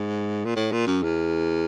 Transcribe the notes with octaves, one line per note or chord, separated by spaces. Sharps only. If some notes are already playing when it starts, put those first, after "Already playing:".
Already playing: G#2
A#2
A2
A#2
F#2
E2